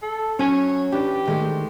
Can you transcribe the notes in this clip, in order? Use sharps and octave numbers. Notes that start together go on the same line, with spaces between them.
A4
F#3 C#4 C#5 G#5
E3 D4 G4
D#3 G#3 A3